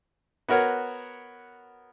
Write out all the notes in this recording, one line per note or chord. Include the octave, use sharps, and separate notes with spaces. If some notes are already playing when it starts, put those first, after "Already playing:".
B3 F#4 A#4 C#5